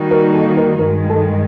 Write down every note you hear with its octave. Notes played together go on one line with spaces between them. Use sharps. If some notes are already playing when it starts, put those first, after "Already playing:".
Already playing: D#3 G3 A#3 D#4 F#4
A#4
A4
A#4
G2 D#3 G#3 A#4
A4